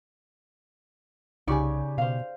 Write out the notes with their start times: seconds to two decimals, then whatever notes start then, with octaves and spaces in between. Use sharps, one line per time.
1.48 C2 C#3 D#4 G4 D5 G#5 C#6
1.98 B2 C5 F5